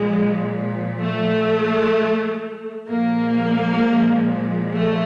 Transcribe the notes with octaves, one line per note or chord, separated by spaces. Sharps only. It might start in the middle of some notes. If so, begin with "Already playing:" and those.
Already playing: A#2 F3 G#3
A3
A#2 F3 G#3 A#3
A3